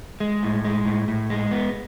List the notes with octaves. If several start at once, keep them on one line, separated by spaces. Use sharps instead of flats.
G#3
A2
G#3
A2
A2
G#3
B3